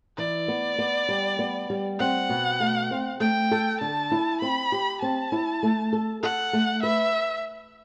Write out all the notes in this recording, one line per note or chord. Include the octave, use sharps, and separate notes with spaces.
E3 D5
B3
B3
G3
B3
G3
C4 F#5
B2
A3
C4
A3 G5
A4
D3 A5
E4
C4 B5
G4
C4 A5
E4
A3
A4
A4 F#5
A3
B4 E5